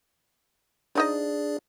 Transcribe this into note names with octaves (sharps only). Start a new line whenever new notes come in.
F3 D4 D#4 G#4 D5 D#5